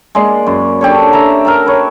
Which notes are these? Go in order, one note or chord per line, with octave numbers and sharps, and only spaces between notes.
G#3 A#3 D5 C6
F#2
D4 G4 A4 C#5
E5 A#5
A#4 E5 A5 A#5
B4 C#5